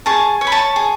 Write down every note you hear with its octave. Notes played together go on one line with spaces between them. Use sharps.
G#4 A5 C#6
C#5
B5
A5 C#6
G#4